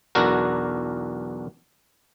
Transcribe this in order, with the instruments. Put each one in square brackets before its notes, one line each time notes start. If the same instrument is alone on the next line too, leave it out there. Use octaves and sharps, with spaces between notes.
[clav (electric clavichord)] B1 E2 D4 F#4 A#4